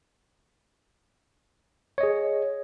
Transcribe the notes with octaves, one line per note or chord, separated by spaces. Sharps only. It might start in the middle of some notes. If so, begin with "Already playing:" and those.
G#4 C#5 D#5